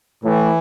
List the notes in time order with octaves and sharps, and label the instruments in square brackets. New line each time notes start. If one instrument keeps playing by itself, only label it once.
[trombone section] A2 [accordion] E3